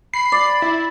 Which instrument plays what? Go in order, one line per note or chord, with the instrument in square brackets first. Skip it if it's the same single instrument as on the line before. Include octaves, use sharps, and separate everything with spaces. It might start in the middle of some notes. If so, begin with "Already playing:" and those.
[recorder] B5 [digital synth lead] C7
[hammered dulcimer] D5
[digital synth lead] E4